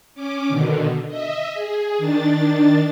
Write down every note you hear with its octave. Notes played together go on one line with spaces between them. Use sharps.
C#4 D6
B2 D3 D#3
D#5 E5
G#4
D#3 D4 A6